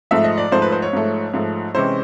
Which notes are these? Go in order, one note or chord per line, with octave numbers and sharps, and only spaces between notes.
G#2 F3 A3 E5
D#5
D5
G#2 F3 A3 C5
B4
C5
C#5
G#2 F3 A3
G#2 F3 A3
C3 E3 G#3 C#4 E4 C5